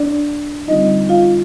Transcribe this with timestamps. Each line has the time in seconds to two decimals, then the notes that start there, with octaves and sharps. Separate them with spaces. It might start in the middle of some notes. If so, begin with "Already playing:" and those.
Already playing: D4 D5
0.68 D3 G3 C4 D#4 F4 D#5
1.09 F4 F5